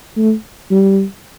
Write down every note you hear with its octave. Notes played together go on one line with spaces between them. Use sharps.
A3
G3